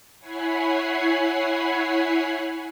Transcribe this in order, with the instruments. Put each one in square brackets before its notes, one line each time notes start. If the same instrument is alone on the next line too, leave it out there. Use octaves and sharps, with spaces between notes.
[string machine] E4 C#5 F#5 G#5 B5 C7